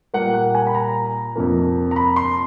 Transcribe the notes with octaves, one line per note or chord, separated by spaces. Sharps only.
A#2 G3 A#3 F#5
F#5
G#5
B5
A#5
F2 C3 F3 A#3
A#5
B5
C6